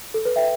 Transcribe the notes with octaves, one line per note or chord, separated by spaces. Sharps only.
A4
B4
E5 G5